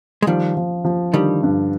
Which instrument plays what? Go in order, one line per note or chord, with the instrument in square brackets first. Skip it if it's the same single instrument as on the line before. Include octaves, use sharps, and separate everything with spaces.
[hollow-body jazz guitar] G#3
[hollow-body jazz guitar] D#3 G3 [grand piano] F3
[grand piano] F3
F3
[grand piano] D3 [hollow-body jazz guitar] D#3 G3
[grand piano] G2